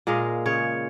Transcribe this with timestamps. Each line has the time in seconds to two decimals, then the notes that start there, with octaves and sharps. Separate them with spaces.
0.07 A#2 G#3 D#5 F5
0.46 C#3 C#5